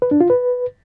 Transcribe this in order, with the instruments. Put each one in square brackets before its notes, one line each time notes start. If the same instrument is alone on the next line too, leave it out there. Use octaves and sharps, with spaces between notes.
[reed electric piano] B4
D4
F4
B4